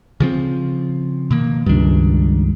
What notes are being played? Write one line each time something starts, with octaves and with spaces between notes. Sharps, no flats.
C#3 F3 C4
B2 D#3 A#3
C#2 G2 D#3 D4